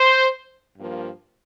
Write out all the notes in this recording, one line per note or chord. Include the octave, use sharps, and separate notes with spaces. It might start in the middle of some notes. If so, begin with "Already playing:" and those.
Already playing: C5
G2 F3 A#3